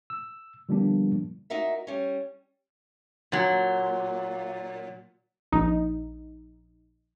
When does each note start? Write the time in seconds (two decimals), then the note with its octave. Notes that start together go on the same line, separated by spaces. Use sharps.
0.10 E6
0.69 D3 F3 G3 A#3 B3 D4
1.50 D#4 F#4 A#4 E5
1.87 G3 C#4
3.32 A#2 F#3
5.52 A#1 D#4